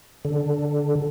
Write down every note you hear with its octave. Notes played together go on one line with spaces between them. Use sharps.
D3